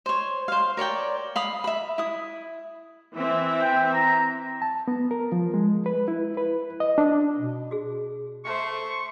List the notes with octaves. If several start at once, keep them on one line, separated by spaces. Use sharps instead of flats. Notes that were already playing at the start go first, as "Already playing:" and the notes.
C5 C#5
C5 F5
A#4 C#5 D5 G5
F5 B5 D#6
E5 B5
E4 D#6
E3 C4 E5
G5
A#5
A5
B3
A#4
F3
G#3
B4
E4
B4
D#5
D4
B2
F#4 G#4
A3 C5 C#6